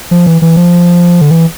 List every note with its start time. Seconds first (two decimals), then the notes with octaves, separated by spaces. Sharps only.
0.11 F3
0.26 E3
0.42 E3
0.56 F3
1.21 D3
1.31 E3